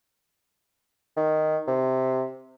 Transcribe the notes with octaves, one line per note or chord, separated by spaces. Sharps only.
D#3
C3